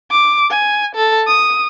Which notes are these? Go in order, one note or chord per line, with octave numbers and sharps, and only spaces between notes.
D6
G#5
A4
D#6